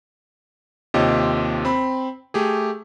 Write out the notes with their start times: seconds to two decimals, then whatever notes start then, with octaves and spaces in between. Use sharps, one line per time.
0.94 D#2 C3 F4 G4 C#5 D#5
1.65 C4 B5
2.34 A3 G4 G#4